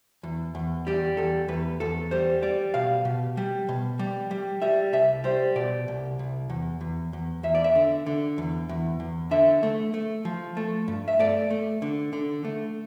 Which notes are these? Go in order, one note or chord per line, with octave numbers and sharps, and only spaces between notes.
E2
E2
G3 G4
E2 A4
E2 B4
E2 A4
G3 C5
G3 D5
B2 F5
B2
G3
B2
G3
G3
G3 E5
C2 E5
G3 C5
B2 D5
C2
C2
E2
E2
E2
E2 E5
D5
E5
D3
D3
E2
E2
E2
D3 E5
A3
A3
F3
A3
G2
E5
A3 D5
A3
D3
D3
A3